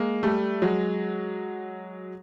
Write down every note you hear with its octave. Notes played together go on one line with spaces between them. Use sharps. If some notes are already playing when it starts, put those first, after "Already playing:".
Already playing: G#3 A#3
G3 A3
F#3 G#3